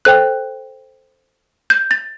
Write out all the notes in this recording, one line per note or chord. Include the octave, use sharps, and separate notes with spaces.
A4 C5 G5 F#6
G6
A6